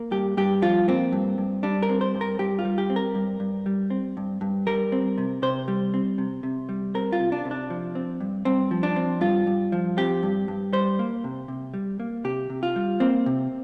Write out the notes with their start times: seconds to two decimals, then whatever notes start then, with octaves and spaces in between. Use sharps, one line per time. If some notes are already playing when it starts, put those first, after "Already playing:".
Already playing: A#3
0.11 G2 G4
0.37 G2 G4
0.62 F3 F4
0.88 A#3 C4
1.13 G2
1.38 G2
1.63 G3 D4
1.83 A#4
1.89 C4
2.01 C5
2.15 G2
2.21 A#4
2.39 G2 G4
2.59 F4
2.65 G3
2.78 G4
2.90 C4
2.96 A#4
3.15 G2
3.40 G2
3.66 G3
3.90 C4
4.17 G2
4.41 G2
4.67 G3 A#4
4.92 C4
5.18 C3
5.42 C3 C5
5.68 G3
5.94 C4
6.18 C3
6.43 C3
6.69 G3
6.95 C4 A#4
7.13 F4
7.20 C3
7.32 D4
7.45 C3
7.51 D4
7.70 F3
7.95 C4
8.20 G2
8.45 G2 C4
8.71 F3
8.83 D4
8.96 C4
9.21 G2 F4
9.47 G2
9.72 F3
9.97 C4 G4
10.23 G2
10.48 G2
10.73 G3 C5
10.99 A#3
11.24 C3
11.48 C3
11.74 G3
12.00 A#3
12.24 C3 G4
12.50 C3
12.63 F4
12.76 G3
13.00 A#3 C4
13.26 C3